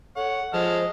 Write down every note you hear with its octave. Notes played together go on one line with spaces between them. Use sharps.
A4 C#5 F#5
F3 G#3 C5 D#5 A5 F6